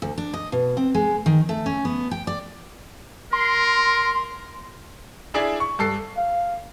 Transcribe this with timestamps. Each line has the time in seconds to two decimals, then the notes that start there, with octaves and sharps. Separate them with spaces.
0.02 D2
0.18 D4
0.33 D#5
0.52 B2
0.77 C4
0.95 G#3
1.26 D#3
1.49 A3
1.66 C#4
1.85 B3
2.11 G5
2.27 D5
3.33 A#4 C6
5.34 D4 E4 G#4 D5 E5
5.60 C#6
5.79 G2 A4 C7
6.17 F5